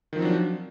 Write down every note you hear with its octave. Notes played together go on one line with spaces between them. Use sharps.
D#3 F3 F#3 C4 D4